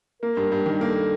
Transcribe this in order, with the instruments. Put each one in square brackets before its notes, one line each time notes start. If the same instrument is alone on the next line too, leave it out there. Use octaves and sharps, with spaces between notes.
[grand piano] A#3 [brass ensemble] A#4
[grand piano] G2
G2
D#3
[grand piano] A#3 [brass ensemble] A4